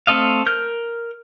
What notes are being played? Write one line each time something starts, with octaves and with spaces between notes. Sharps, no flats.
A3 C4 A4 D#5 F5
A#4 F6 G6